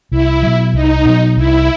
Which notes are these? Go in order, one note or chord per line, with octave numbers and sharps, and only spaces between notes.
C2 E4
B2 F#3
C2 D#4
B2 F#3
C2 E4